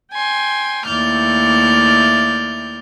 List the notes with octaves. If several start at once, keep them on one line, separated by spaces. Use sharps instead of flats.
G5 G#5 C6
D#2 A3 E4 D5 F6 G6